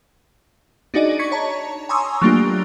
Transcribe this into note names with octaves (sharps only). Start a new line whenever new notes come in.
D4 D#4 F#4 G#4 D5 D#5
C#6 G#6 B6 C#7
C#5 A5 A#5
G#5 A#5 C6 C#6 D#6 E6
F#3 A3 A#3 D4 F4 G4